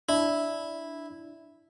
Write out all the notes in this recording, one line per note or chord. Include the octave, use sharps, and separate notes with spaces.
D4 E4